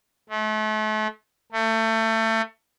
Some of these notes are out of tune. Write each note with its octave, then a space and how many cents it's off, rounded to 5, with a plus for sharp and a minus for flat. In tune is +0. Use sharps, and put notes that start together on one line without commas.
A3 -35
A3 +25